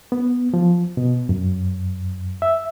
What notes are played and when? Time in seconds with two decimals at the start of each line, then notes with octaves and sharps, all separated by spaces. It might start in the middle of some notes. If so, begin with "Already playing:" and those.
0.12 B3
0.54 F3
0.97 B2
1.29 F#2
2.42 E5